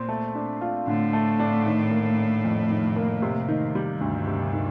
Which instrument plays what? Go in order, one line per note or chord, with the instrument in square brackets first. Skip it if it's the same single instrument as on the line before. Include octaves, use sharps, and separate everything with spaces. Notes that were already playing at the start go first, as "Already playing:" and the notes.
Already playing: [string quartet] A#2 [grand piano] C4
[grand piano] A3
D4
F4
[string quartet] A2 [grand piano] D3
[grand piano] A3
D4
D#3
A#3
D4
F2
D#3
A#3
C3
D#3
G3
[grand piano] D2 [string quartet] G2
[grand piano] C3
D#3